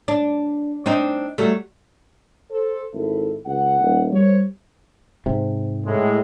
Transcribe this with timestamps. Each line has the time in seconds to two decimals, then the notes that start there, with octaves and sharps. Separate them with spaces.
0.08 D4
0.86 C4 D4 D#4
1.38 F#3 G3 A3
2.50 A4 C5
2.94 G#1 E4 A4
3.46 C#2 F#5
3.81 D#1
4.12 G3 A#4 C5 C#5
5.26 G#2 C3
5.85 A2 G#3